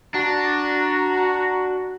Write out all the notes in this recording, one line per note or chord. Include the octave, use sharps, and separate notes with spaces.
D4 F#4 A#5